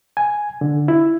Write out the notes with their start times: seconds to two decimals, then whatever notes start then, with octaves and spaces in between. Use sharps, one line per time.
0.17 G#5
0.61 D3
0.88 E4